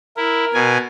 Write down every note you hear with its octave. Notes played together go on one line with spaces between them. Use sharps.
E4 A#4
B2 G#5